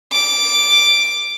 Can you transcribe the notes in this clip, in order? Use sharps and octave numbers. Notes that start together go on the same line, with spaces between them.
D6